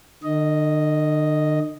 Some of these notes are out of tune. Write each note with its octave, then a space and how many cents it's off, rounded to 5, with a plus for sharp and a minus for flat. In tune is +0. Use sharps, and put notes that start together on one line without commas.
D3 +45 D#5 +0